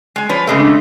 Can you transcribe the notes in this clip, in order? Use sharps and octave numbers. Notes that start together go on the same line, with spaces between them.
G#3 G#5
F3 B4 C#5
C#3 G#3 A3
D4